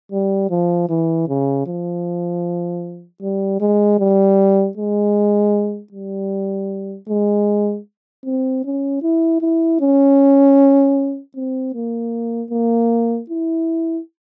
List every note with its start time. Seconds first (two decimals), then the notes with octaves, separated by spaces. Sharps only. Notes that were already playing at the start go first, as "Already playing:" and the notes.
0.12 G3
0.51 F3
0.89 E3
1.28 C#3
1.67 F3
3.22 G3
3.61 G#3
3.99 G3
4.77 G#3
5.92 G3
7.09 G#3
8.26 C4
8.65 C#4
9.02 E4
9.42 E4
9.81 C#4
11.36 C4
11.74 A#3
12.51 A#3
13.30 E4